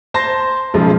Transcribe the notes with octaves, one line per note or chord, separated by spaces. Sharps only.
C5 A5 C6 A#6
B1 C#3 F3 G#3